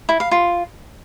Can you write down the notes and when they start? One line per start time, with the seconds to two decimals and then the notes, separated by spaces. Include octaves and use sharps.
0.09 E4
0.20 F5
0.31 F4